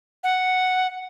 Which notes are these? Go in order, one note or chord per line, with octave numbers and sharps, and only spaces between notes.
F#5